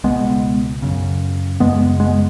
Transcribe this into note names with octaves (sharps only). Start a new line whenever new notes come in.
C#2 B2 G#3 B3
F#2 C#3
F#2 C#3 G#3 B3
G#3 B3